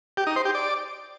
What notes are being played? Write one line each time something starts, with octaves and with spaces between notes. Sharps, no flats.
G4
D#4
C5
G4
D5